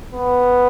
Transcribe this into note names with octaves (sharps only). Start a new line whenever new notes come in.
B3